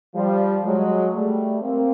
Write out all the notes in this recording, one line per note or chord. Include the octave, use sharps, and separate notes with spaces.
F3 G3
F#3 G#3
G3 A3
A#3 C4